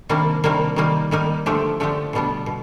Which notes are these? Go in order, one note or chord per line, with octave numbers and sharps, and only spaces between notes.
C3 D#3 G3 A#3 D4
C3 D#3 G3 A#3 D4
D#3 G3 A#3 D#4
D#3 G3 A#3 D#4
D3 F3 A3 D4 G4
D3 F3 A3 D4 G4
B2 G3 B3 D4
B2